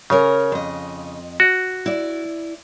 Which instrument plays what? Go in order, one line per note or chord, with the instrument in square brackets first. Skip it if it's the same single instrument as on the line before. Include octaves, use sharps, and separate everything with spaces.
[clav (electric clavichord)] C#3 [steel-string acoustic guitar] A#4 C#5 G#5
[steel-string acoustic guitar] F2 D#5
[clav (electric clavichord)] F#4
[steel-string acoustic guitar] E4 D5